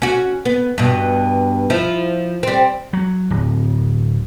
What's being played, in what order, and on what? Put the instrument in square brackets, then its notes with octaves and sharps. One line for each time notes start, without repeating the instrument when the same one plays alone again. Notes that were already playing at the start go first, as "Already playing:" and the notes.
[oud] C#4 F#4
B3
G2 B2
F3 E4
G3 C4
[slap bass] F#3
D1